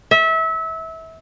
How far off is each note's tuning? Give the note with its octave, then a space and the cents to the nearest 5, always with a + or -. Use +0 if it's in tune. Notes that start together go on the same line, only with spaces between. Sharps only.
E5 -25